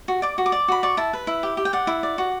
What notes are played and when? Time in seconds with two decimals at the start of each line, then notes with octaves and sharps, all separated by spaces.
0.08 F#4
0.22 D5 D6
0.38 F#4
0.46 D6
0.52 D5
0.68 F#4 B5
0.83 D5 C#6
0.97 E4 A5
1.13 B4
1.27 E4
1.43 G4
1.57 G4
1.65 G5
1.73 D5 F#5
1.87 E4
2.03 D5
2.18 F#4